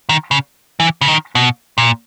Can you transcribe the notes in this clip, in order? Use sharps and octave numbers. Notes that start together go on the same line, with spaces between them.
D#3
C#3
E3
C#3
D#3
B2
A#2